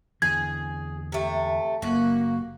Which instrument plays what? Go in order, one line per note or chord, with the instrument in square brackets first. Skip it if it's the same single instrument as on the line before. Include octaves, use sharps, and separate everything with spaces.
[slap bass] E2 D3 E3 [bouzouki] G#4 [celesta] G#6
[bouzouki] C3 A3
[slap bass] F#1 C#3 [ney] A#3 [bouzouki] F#4